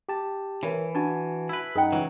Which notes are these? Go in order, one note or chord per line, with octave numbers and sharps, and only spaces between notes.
G4 A5
E3 A#4 C#5
D4 F#4 G#5 A5
E4 B4
F#2 D#4 G#4 F#5 G5
C#2 E3 F#3